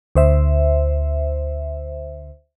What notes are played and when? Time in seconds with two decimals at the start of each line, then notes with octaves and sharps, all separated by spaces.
0.15 D2 C5 E5